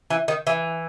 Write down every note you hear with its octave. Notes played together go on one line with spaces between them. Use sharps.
E3
D#3
E3